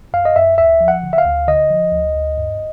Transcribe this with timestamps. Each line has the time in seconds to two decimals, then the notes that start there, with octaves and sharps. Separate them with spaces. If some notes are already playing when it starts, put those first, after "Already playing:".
0.14 F#2 F5
0.25 D#5
0.36 F#2 E5
0.58 D2 E5
0.81 F3
0.88 F#5
1.03 D3
1.13 E5
1.18 F5
1.26 D2
1.48 D3 D#5
1.70 F3
1.92 D2
2.15 D2
2.38 G2